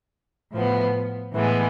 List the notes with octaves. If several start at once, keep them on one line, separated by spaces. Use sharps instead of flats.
A2 F3 B3
A2 E3 G#3 B3